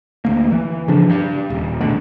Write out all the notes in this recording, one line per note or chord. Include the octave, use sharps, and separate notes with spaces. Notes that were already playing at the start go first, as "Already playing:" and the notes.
D2 A#3
E3
C#3 F3 D4
G2
D#1
A1 D2 B2 D3